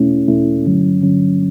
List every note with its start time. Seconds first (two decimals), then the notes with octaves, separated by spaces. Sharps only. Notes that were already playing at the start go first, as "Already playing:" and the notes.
Already playing: E2 B2 A3 C#4 E4
0.28 E2 B2 A3 C#4 E4
0.65 G2 D3 F#3 C#4
1.01 G2 D3 F#3 C#4